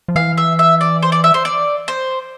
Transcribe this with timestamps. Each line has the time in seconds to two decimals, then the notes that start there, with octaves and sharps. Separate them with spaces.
0.08 F3
0.16 E3 F5
0.38 E5
0.59 E5
0.81 D5
1.03 C5
1.12 D5
1.24 E5
1.34 C5
1.45 D5
1.88 C5